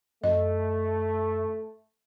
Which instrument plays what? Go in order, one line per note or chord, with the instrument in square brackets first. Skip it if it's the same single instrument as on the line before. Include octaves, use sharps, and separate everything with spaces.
[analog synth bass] F#2 [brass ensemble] A3 [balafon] D#5